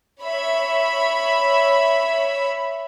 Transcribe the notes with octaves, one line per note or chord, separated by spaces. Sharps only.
C#5 E5 B5